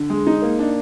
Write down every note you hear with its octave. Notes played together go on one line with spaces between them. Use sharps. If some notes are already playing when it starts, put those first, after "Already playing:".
Already playing: D3
G#3
D#4
A#3
D4